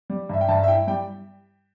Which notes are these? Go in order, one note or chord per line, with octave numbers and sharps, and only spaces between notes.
G3
G2 E5
G5
G2 E5 A5
E5
E4 G5
G3 G5